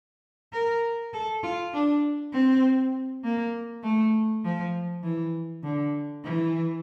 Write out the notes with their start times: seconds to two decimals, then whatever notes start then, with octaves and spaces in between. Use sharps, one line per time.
0.53 A#4
1.14 A4
1.43 F4
1.74 D4
2.33 C4
3.24 A#3
3.83 A3
4.44 F3
5.03 E3
5.63 D3
6.25 E3